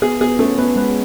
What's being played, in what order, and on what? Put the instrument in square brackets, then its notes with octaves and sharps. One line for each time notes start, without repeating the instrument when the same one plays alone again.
[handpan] B3 [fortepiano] G#4
[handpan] B3 [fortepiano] G#4
[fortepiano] A3 [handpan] C#4
[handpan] B3 [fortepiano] B4
[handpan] G#3 [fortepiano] B4